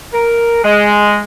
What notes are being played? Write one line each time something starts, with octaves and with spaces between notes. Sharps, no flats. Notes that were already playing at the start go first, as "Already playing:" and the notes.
A#4
G#3